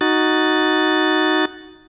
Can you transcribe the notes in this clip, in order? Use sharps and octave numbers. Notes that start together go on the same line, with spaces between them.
D#4 F#4 A6